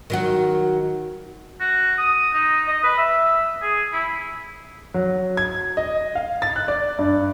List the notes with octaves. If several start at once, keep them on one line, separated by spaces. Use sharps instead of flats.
D#3 F#3 F#4
F#4
D#6
D#4
D#5
B4
E5
G#4
E4
F#3
G#6
D#5
F5
A6
F#6
D5
G2